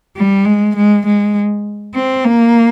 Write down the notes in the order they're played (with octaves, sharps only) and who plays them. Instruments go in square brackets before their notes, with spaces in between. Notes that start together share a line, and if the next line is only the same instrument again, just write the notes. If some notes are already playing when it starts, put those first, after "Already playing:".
[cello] G3
G#3
G#3
G#3
C4
A#3